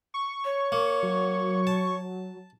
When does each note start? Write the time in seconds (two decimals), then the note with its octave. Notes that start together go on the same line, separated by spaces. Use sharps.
0.14 C#6
0.45 C#5
0.72 A#3
1.03 F#3
1.67 A5